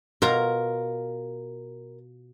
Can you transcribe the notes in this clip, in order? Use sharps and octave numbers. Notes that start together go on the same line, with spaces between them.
B2 F4 A#4 A#5